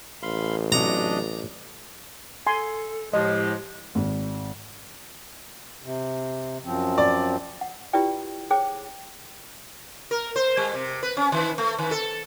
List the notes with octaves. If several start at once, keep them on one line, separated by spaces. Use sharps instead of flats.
A1 F5 B5 C6
C3 F#3 D4 D#5 A#5
A4 G#5 C6
A2 F3 G#3 G4 D#5
G#1
C3
F#2 F3 C4
D5
F#5
E4 F4 G4 B4 D5 G5
G#4 C5 C#5 G5 D6
A#4
C5
G3
C3
B4
C#4
D#3
A3
D#3
A4